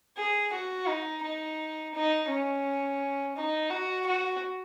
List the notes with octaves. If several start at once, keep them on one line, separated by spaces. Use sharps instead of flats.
G#4
F#4
D#4
D#4
D#4
C#4
D#4
F#4
F#4